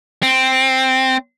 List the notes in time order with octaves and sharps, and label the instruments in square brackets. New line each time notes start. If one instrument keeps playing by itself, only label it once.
[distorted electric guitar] C4